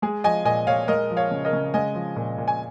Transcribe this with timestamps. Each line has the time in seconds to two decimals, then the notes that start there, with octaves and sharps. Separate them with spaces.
0.02 G#3 G#4
0.24 F3 D#5 G#5
0.45 A#2 D#5 G#5
0.67 A#2 C#5 F5
0.88 G#3 A#4 D#5
1.10 F3
1.17 C#5 F5
1.31 C#3
1.45 A#4 D#5
1.53 C#3
1.74 G#3 D#5 G#5
1.95 F3
2.16 A#2
2.38 A#2
2.48 G#5